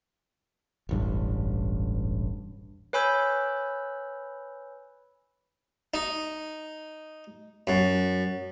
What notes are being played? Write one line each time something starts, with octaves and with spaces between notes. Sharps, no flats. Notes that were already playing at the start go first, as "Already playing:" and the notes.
E1 A1 G2
B4 C#5 G#5 B5 E6 G6
D#4
F#2